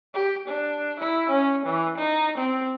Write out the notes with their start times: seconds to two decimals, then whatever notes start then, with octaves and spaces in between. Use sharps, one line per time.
0.14 G4
0.48 D4
1.00 E4
1.30 C#4
1.66 E3
1.98 D#4
2.38 C4